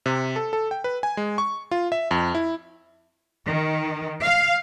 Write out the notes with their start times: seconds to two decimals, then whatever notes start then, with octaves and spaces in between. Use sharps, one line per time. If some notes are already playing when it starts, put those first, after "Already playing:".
0.06 C3
0.36 A4
0.53 A4
0.71 G5
0.84 B4
1.03 G#5
1.17 G#3
1.38 C#6
1.71 F4
1.92 E5
2.11 F2
2.35 E4
3.47 D#3
4.22 F5